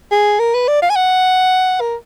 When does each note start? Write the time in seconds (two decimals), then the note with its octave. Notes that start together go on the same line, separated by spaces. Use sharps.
0.11 G#4
0.39 A#4
0.54 B4
0.68 D5
0.82 F5
0.90 G#5
0.95 F#5
1.80 A#4